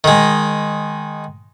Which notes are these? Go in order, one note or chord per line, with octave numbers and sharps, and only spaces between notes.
D#3 G#3